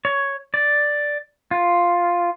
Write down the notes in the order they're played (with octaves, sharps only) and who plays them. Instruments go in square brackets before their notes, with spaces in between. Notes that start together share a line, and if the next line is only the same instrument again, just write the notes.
[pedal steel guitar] C#5
D5
F4